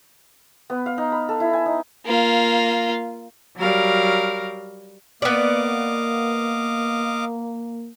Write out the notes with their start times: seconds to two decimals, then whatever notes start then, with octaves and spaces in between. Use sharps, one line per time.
0.70 B3
0.86 F5
0.98 D#4
1.12 B5
1.29 A4
1.40 E4
1.53 G#5
1.66 D#4
2.05 A#3 F4
3.56 F#3 G3 A#4 F5
5.22 A#3 B3 D5 D#5 F5 D6